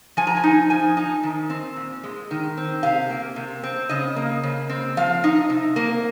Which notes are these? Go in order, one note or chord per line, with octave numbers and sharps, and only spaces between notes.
F3 G#5
A#5
G#5
D#4
F3 G#5
D#4
D#3
C4
A#2
G#3
D#3
C4
C3 F5
A#3
C3
C4
C#3 D#5
A#3
C#3
C4
F3 F5
D#4
C3
A#3